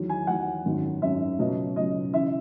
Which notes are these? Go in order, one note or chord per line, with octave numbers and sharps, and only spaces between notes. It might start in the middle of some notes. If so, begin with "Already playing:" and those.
Already playing: E2 D#3 F#3
G#5
E2 D#3 F#3 F#5
G#1 F#2 D#3 F#3
G#1 F#2 D#3 F#3 E5
C#2 B2 F#3 D#5
C#2 B2 F#3 D#5
C#3 E3 E5